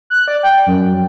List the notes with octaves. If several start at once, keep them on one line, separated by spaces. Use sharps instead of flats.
F#6
D5
G5
F#2